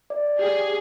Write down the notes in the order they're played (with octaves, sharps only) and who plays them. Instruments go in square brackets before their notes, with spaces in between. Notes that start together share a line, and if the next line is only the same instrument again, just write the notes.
[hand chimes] D5
[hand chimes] G4 [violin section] G#4